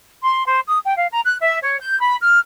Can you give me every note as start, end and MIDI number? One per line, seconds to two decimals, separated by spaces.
0.23 0.45 84
0.46 0.59 72
0.68 0.78 87
0.84 0.94 79
0.96 1.07 77
1.11 1.21 82
1.25 1.36 90
1.40 1.59 76
1.63 1.77 73
1.80 1.98 91
2.00 2.17 83
2.21 2.39 89